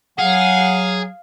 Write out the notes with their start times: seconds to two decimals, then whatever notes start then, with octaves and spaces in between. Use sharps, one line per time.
0.19 F#3 G#4 F5 F#5